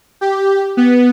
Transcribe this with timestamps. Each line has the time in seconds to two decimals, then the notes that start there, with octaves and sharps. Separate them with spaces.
0.21 G4
0.77 B3